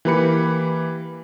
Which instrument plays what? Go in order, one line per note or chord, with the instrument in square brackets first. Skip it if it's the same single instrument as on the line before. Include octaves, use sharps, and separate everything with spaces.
[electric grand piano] E3 A#3 G4 B4 B5 C#7